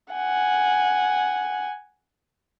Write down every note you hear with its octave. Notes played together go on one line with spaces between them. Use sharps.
F#5 G#5